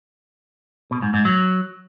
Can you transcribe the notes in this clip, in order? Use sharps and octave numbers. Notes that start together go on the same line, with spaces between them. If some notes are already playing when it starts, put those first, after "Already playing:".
B2
G#2
G#2
F#3